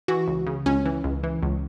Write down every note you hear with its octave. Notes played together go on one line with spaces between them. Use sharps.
E3 F#4
C#2
C#3
C#2 C#4
E3
C#2
E3
C#2